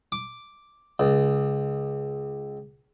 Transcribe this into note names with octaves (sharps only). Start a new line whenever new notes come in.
D6
C#2